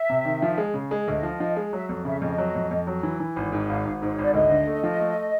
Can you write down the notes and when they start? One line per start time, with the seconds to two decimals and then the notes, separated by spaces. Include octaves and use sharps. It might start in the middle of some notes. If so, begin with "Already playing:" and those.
Already playing: E5
0.10 C3
0.25 D#3
0.42 F3
0.57 G#3
0.74 C#3
0.91 G#3
1.08 D2 D#5
1.23 F3
1.40 F3
1.56 G#3
1.73 F#3 E5
1.89 F2
2.05 C#3 E5
2.22 F2 D#5
2.38 F#3
2.55 F2
2.71 F2
2.87 F#3
3.03 E3
3.20 E3
3.36 G#1
3.52 G#2
3.69 G#1 F5
3.85 G#1
4.02 G#2 C5
4.14 G#1 C#5
4.24 D5
4.34 D2 D#5
4.50 D3
4.67 A3
4.83 F3
5.00 A3